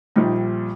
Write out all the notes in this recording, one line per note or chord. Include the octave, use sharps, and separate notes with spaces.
A#1 A#2 G3 D#4